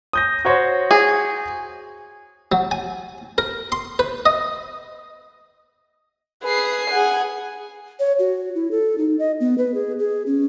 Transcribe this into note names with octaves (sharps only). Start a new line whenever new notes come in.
D#6 G6 A#6
F#4 C5 C#5
G#4
F#3
G#5
A#4
C6
B4
D#5
G#4 B4 C7
G#4 F#5 G#5
C#5
F#4
E4
A4
D#4
D#5
B3
B4
G#4
G#4
C#4